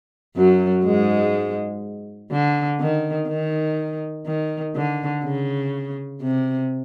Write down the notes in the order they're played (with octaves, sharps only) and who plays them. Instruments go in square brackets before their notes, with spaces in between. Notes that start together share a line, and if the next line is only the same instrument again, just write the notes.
[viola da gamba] F#2 F#3
G#2 G#3
D3
D#3
D#3
D#3
D3
C#3
C3